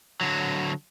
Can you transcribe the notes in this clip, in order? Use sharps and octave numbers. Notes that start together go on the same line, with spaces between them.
D3 F#3